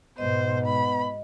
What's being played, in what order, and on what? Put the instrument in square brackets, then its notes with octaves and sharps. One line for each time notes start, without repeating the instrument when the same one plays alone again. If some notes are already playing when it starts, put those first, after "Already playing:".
[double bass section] G#2 B2 [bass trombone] B3 [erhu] C5 [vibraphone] D#5
[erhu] B5